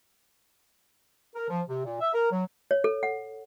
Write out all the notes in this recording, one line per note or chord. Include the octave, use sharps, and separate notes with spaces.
A#4
F3
C3
A#2
E5
A#4
F#3
C#5
A4
F#5